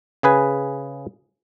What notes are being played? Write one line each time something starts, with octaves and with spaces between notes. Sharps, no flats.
C#3 G#4 B4 G#5